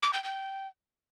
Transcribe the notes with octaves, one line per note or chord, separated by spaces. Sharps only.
D6
G5
G5